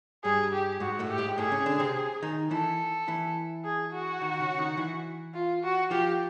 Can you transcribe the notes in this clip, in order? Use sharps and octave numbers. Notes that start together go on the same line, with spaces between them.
G2 G3 G#4
G4
G#2 G#3 F#4
A2 A3
G4
G#2 G#3
A2 A3 G#4
C#3 C#4
D3 D4
C3 C4
D#3 D#4
E3 E4 A4
E3 E4
G#4
F#4
D#3 D#4
C#3 C#4
D#3 D#4
E3 E4
F4
F#4
F3 F4 G4